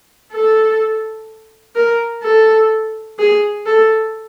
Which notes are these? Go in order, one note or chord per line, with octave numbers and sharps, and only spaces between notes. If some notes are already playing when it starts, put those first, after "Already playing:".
A4
A#4
A4
G#4
A4